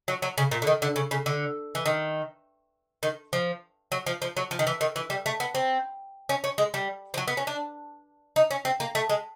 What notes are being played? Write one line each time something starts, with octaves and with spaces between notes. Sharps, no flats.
F#3
F#3
C#3
A#2
D3
D#3
D3
C#3
C#3
D3
E3
D#3
D#3
F3
F#3
F3
F3
F#3
F3
D#3
E3
D#3
E3
G3
A3
B3
C4
C#4
C#4
G#3
G3
F3
F#3
B3
C#4
D4
D#4
C#4
C4
A#3
A3
G#3